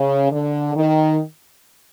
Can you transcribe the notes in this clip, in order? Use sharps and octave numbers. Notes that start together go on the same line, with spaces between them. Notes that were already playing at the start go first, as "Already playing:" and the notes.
Already playing: C#3
D3
D#3